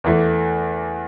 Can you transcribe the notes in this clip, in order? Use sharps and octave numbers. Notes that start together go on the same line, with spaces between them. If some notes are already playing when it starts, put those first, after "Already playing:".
E2 E3 A3